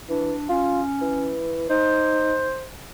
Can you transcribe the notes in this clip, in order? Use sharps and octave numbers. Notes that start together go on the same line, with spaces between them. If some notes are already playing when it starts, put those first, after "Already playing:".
E3 D4
C#4 F4
E3
D#4 C5